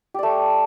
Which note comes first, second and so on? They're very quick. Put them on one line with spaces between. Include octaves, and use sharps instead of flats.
G4 D5 A3